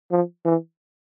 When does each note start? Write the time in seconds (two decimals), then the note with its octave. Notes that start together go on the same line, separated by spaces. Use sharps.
0.11 F3
0.45 E3